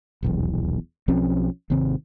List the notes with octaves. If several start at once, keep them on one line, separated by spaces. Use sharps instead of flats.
D#1 B1 E2
B1 F3 C4 C#4
G#1 C3 D#3 C4